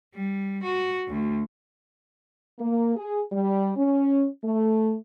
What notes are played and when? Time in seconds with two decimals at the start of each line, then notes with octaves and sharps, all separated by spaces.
0.14 G3
0.63 F#4
1.08 D2
2.59 A#3
2.96 G#4
3.32 G3
3.76 C#4
4.44 A3